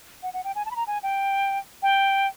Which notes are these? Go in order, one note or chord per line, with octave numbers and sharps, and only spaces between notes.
F#5
F#5
G5
G#5
A5
B5
A#5
G#5
G5
G5